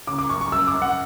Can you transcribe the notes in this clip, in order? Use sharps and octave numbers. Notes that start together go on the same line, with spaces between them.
C#3 D6
D6
F#2 C#6
C#6
F#2 E6
D6
F#2
F#5